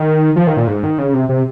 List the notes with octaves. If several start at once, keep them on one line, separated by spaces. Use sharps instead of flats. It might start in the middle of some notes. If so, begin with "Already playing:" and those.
Already playing: D#3
F3
D#3
A#2
G#2
D#3
C#3
C3
C3